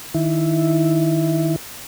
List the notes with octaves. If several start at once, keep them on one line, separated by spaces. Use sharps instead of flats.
D#3 E4